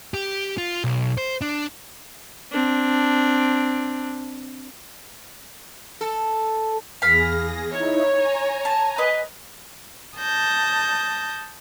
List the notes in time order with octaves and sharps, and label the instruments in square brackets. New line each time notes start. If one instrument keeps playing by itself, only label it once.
[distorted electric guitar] G4
F4
B1
C5
D4
[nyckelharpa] C4 D4
[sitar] A4
[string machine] E2 G#4 A#6 [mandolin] F5 B5
[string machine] D#4 E4 [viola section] C#5
[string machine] G#5 A#5
[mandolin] A5
B4 D#5
[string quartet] A5 D#6 G6 A#6